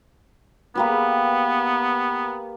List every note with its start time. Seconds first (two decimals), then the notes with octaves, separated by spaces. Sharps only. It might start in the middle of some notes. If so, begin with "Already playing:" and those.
0.75 A#3 B3 G4 B4